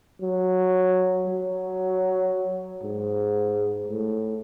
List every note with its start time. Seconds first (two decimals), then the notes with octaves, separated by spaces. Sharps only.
0.21 F#3
1.26 F#3
2.83 G#2
3.88 A2